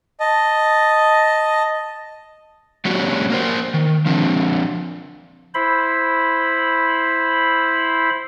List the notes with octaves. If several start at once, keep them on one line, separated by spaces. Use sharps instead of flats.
D#5 A5
F#3 A#3 C#4 D4 F#4 G4
A#3 A#4 C5
D#3
F3 C4 D4
E4 C5 B5